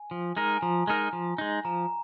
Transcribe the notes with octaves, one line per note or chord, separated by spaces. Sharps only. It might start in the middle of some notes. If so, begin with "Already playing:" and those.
Already playing: G#5
F3
G#3 D#4 A#4
G#5
F3 A#5
G#3 D#4 A#4 A#5
F3
G#3 D#4
F3 A#5